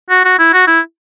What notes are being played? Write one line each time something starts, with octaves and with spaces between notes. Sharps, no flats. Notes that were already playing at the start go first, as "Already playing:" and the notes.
F#4
F#4
E4
F#4
E4